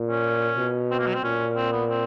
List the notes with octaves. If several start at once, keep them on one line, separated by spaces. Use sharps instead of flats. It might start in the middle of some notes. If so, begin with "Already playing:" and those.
Already playing: A#2
C#4
B2
C4
A#3
F#3
C4
A#2 C#4
C4
B3
C4